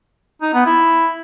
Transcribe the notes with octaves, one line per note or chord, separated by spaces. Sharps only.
D#4
B3
E4